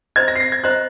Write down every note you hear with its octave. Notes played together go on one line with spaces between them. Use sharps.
C5 D#5 A#5 G#6
A#6
C7
A#6
G#6
C5 D#5 A#5 F#6